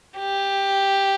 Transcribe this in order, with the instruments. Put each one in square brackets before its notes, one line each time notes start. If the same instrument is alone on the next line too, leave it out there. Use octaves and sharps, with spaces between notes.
[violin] G4